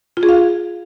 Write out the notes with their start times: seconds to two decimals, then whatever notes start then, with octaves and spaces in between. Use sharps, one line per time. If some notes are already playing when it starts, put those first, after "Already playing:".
0.17 F4
0.23 G#4
0.29 F5